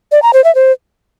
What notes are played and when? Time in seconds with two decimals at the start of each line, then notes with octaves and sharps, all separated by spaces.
0.12 D5
0.22 A#5
0.33 C5
0.44 E5
0.55 C5